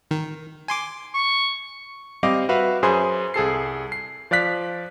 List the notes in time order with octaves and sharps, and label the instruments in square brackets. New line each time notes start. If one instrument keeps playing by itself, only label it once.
[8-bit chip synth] D#3
G#5 C6 D6
[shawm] C#6
[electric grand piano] G3 C4 D#5 F5 D6
F#4 B4 E5 F5
F#2 G#4 C5 G#5 B5 C6
C2 G#4 A4 C7
C7
F3 D5 F5 F#6 B6